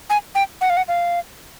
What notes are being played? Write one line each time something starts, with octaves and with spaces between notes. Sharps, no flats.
G#5
G5
F#5
F5
F#5
F5